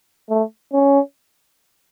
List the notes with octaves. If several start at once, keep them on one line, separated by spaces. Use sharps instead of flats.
A3
C#4